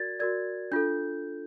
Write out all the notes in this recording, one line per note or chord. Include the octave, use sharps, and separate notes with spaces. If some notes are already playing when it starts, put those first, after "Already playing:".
Already playing: F#4 A#4 D5 G#6 A6
F#4 A#4 D5 G#6
D4 F4 A4 G6